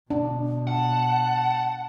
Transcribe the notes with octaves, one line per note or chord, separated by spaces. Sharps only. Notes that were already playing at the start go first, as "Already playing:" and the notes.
B2 D4
F#5 A5